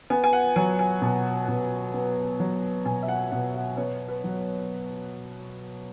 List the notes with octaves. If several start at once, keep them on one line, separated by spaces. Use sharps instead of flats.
B3 G#5
G#5
F#5
F#3 G#5
G#5
B2
B2
B3
F#3
B2 G#5
E5
F#5
B2 F#5
F#5
B3 C#5
B4
F#3